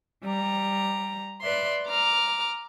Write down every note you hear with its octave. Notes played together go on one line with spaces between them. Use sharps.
G3 A#5
B4 D5 E5 C6
A#5 D6 F6